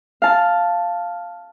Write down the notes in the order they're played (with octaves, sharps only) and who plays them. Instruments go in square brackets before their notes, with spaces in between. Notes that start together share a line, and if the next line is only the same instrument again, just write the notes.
[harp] F5 A5